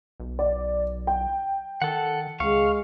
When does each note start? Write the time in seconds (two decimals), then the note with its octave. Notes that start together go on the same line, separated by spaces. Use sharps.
0.20 B1
0.39 D5
1.07 G5
1.82 D#3 A4 F#5
2.40 C#2 G#3 F5 C#6